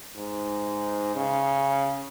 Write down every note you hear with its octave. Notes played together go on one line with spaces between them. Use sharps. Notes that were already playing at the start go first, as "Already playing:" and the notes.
G#2
C#3